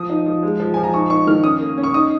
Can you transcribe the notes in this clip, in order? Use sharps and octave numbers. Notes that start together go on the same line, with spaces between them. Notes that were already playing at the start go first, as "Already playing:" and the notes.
Already playing: F3 D#6
D#4
F3
G#3
F3
F3 G#5
A#5
D#4 C#6
D#4 C#6
D#3 F6
C#4 D#6
A#3
C#4
C#6
D#4 D#6